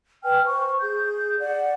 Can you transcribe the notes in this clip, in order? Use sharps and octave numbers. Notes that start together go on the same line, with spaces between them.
B4 G5 G#5 F6
C5 C#6
G#4 G6
D5 F#5